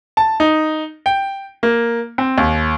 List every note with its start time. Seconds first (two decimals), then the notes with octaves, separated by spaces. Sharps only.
0.17 A5
0.40 D#4
1.06 G5
1.63 A#3
2.18 C4
2.38 D#2